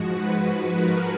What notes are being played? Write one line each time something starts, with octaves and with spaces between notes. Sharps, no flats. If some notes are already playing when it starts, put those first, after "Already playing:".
Already playing: G#2 F3 G#3 F#4
B4
A#4